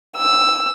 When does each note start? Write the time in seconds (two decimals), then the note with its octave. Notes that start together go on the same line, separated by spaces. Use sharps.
0.18 E6